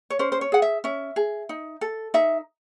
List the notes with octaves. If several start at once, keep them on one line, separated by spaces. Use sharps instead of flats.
C#5
C#4 C5
C5
C#5
G#4 F#5
E5
C#4 E5
G#4
D#4
A4
D#4 E5